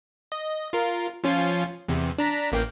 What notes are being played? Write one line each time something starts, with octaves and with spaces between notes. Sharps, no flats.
D#5
F4 A#4
F3 C#4 F4
E2 C3
D4 A#5 B6
A1 A#3 G5